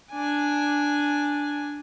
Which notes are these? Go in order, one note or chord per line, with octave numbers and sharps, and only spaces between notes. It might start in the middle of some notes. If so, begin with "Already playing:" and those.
D4 G#5